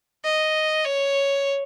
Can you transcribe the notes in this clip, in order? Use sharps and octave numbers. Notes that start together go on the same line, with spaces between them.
D#5
C#5